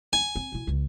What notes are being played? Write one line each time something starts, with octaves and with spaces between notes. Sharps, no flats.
G#5
C4
B2 E4
C#2